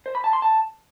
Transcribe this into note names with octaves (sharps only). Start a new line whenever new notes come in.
C5
B5
A5
C6
A5